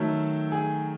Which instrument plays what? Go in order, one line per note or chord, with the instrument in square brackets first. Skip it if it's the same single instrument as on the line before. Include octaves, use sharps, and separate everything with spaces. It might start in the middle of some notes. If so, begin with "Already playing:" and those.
Already playing: [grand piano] D#3 F#3 A3 A4
G#4